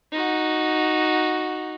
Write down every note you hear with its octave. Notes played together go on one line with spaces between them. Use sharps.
D#4 F#4